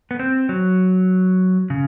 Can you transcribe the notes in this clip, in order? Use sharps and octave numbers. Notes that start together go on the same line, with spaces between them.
B3
C4
F#3
C#3